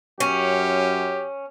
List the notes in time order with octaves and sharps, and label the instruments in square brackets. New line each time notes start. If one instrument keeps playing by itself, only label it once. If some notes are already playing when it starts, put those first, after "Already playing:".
[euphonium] F#2 [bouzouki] C#4 [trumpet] G4